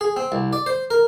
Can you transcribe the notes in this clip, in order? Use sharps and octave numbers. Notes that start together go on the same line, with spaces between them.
G#4
C4
C2
D5
C5
A#4